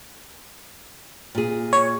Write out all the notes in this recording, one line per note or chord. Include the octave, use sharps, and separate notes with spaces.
A#2 G#4
C#5